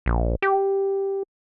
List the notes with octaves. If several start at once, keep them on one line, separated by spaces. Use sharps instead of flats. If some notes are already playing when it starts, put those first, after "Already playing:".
A#1
G4